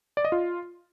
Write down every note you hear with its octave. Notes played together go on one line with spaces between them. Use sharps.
D5
D#5
F4